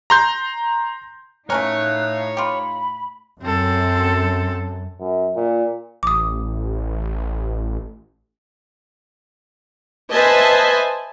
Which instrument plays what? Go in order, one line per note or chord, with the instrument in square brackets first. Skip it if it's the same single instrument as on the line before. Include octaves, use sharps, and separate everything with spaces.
[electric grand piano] A#5 C6 G6
[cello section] A2 D#4 F5 [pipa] A3 C#4 A#4 [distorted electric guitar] C#5 [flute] F#6
[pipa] F4 G4 [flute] B5
[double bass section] F#2 [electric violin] C4 A4
[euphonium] F#2
A#2
[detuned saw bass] A1 [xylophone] D6 D#6
[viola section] B4 C5 D#5 E5 G#5 A5